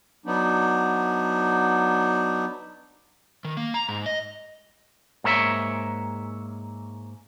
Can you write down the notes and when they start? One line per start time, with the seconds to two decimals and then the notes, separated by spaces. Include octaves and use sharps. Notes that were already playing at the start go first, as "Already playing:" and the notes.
0.26 F#3 B3 D4 D#4
3.45 D#3
3.57 A#3
3.74 A#5
3.89 G#2
4.06 D#5
5.24 G#2 A#3 C#5 E5